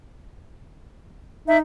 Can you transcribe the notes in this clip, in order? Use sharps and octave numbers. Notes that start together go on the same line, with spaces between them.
D#4 E5